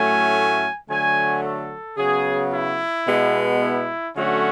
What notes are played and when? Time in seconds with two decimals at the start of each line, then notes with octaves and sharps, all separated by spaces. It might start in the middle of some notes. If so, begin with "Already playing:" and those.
Already playing: A2 F#3 A3 C#4 G#5
0.88 D3 F#3 A3 G#5
1.43 A4
1.97 C#3 F#3 B3 G#4
2.52 E4
3.06 B2 G#3 B3
3.61 E4
4.15 D3 F#3 A3 C#4 F#4